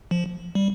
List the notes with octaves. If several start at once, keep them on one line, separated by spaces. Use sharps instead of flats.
F3
G3